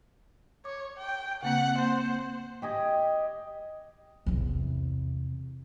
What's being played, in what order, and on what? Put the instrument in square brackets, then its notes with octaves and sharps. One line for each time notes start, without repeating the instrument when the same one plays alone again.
[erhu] C#5 [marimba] D6
[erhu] G5
[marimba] C#3 A#3 C4 [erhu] F#5
[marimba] A#3 [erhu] C5
[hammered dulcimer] G4 D#5 G#5
[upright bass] E2 C3